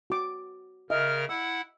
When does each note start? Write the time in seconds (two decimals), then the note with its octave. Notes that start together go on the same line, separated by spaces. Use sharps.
0.10 F#4 D6
0.90 C#3 A#4 D#5 E5 F6
1.29 E4 F#5 E6